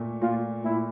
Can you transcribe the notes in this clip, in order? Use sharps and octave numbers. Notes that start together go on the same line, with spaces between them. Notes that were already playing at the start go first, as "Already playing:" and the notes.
Already playing: A#2 A3
A#2 F4
A#2 E4